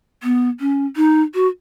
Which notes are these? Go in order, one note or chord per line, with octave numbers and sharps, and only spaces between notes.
B3
C#4
D#4
F#4